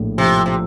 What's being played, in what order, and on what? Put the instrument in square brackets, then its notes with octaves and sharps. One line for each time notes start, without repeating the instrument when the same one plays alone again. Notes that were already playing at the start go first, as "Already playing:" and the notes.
Already playing: [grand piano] A#1 A2
[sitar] C3 [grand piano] F3
[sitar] C3